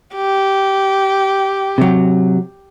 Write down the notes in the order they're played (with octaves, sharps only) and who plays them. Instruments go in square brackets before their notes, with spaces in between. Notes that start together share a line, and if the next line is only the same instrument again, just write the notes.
[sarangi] G4
[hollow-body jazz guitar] C3 F#3